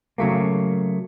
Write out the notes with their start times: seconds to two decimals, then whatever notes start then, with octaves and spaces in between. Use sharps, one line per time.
0.18 C#3 F#3 A3 A#3